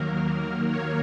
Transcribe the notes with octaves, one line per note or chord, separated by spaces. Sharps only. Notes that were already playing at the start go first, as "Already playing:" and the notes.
Already playing: D#2 D#3 F#3 A#3 A#4
C#5